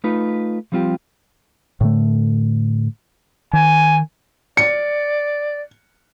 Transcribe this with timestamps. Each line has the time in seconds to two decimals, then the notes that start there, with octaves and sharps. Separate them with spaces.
0.04 A3 D#4 F4 B4
0.72 F3 G3 C4 F4 G4
1.81 A2 D3 A3
3.53 D#3 G#5
4.57 D5 C#7